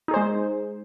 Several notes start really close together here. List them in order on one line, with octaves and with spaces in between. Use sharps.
D#4 G#4 C5 G#3